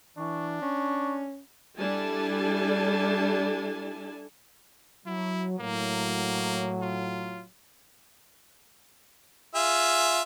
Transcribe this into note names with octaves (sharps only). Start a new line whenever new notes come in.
E3 D4 C#6
C#4 C#6
G3 D4 E4 A4 G#5 A5
F#3 E4
A2 F#3 A#3
F4
F4 G#4 E5